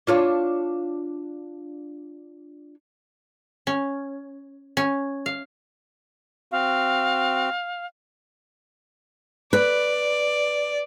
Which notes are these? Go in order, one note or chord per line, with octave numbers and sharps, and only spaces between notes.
D4 F4 C#5
C#4
C#4
F5
C4 F#4 F5
B4 D5